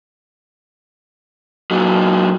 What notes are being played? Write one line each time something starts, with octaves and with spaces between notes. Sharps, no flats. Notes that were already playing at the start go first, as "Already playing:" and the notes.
A#2 F#3